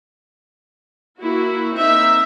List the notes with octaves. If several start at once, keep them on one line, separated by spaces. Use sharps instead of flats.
A#3 E4 F#4
A#3 C4 D#4 E5